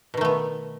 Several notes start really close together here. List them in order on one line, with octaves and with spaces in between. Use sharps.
B2 D#3 A3 B3